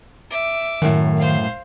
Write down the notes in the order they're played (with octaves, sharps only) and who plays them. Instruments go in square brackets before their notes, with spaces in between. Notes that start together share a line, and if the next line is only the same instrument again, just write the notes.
[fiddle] E5 D6
[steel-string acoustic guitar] F#2 A2 [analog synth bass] D#3
[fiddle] C5 F5